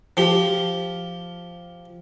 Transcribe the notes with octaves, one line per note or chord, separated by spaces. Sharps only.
F3 G4